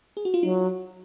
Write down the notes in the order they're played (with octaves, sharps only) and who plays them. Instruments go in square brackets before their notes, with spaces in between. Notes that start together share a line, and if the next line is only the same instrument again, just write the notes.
[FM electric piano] G#4
F#4
F4
[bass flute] F#3 [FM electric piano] D#4